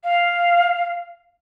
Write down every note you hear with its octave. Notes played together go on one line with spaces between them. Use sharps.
F5